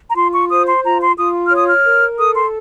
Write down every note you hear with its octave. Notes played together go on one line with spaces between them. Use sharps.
A#5
F4 C6
C#6
C5 D#6
C6
F4 A#5
C6
F4 D#6
F6
C#5 D#6
F6
A#4
A4 D#6
C6